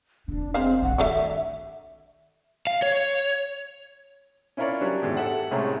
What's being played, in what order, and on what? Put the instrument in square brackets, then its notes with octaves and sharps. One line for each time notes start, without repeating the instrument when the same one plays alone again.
[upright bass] F1 C3 [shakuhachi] D4
[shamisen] G#3 C5 F5 [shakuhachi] C4
[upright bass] A#1 G2 [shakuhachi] F#5
[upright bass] D#3 [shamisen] A3 D4 F#4 [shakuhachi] E5
[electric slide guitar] F5
C#5
[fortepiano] C#4 E4 F4 A#4 C#5 D5
F#3 G3 C#4 D4
E2 G#2 D#3
G4 A4 E5 F#5
C2 A2 G#3 A3 C#4 A#5